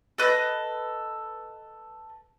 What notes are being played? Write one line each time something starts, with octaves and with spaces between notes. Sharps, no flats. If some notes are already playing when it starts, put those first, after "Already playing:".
A4 B4 D#5